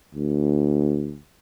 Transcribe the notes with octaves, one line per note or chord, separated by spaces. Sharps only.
D2